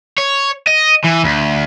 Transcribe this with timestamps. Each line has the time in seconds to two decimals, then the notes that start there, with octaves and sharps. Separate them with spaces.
0.18 C#5
0.67 D#5
1.04 E3
1.24 D2